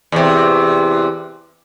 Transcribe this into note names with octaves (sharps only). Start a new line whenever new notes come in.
E2 C3